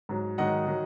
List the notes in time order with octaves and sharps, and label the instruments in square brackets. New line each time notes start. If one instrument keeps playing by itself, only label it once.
[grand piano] G#2 F#3
G#2 D#3 F#3 D#5 F#5
D#3 F#3